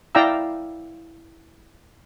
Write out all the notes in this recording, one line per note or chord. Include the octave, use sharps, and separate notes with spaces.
E4 D5 F5 G5 A#5 E6